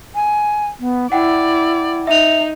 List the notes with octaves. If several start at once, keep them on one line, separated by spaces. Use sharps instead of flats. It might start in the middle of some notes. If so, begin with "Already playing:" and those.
G#5
B3
E4 D5 F#5 G5
D#4 E5 F7